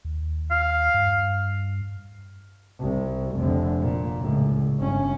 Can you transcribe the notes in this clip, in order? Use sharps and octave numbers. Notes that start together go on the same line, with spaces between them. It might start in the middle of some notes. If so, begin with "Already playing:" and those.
D#2
F5
G2
C2
F1 D3
A#2
C#2 A2
G1 C#4